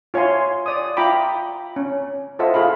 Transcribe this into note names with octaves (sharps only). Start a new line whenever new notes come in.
F4 C#5 E5 G#5 C6
D5 D#6
F4 E5 G5 A#5 B5 D6
C#4
F4 A4 C5 D#5 E5 F#5
F4 G#4 F5 B5